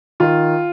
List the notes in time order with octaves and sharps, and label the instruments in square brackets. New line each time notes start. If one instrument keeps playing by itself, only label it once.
[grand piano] D#3 F4